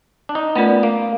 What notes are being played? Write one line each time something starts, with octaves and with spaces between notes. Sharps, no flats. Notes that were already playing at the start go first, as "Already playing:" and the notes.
D4
D#4
A3 B3 C#4 F4 A#4 D5
A#3